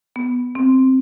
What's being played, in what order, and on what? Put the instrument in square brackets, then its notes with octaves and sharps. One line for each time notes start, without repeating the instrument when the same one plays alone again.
[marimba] B3
C4